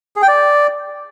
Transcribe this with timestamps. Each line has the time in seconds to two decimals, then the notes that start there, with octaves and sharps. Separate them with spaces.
0.16 G#4
0.22 G5
0.28 D5